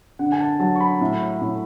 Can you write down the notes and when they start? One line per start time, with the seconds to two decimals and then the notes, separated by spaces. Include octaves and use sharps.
0.19 D3 F#5
0.32 G#5
0.40 A5
0.60 F#3 A5
0.76 C#6
0.81 B5
1.01 A2
1.41 A2